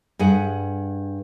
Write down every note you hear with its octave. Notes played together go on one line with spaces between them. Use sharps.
G2 G#4 F#5